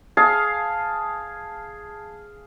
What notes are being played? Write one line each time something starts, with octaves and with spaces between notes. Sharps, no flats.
G#4 F5 A5